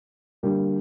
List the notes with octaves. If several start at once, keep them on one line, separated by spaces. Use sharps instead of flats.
D3 G3 A#3 D4